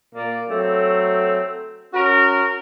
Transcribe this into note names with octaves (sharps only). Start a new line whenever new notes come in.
A#2 A#3 D5
F#3 A3 C4
C#4 F#4 A#4